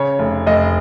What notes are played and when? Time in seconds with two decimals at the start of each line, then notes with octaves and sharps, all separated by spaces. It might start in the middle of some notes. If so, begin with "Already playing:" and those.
Already playing: C#3 C#5
0.19 F1
0.46 F1 D#5